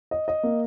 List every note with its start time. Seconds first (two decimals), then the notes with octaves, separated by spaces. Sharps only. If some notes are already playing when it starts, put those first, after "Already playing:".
0.11 D#5
0.28 D#5
0.43 A#3